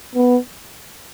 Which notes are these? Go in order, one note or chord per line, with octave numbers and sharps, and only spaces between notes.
B3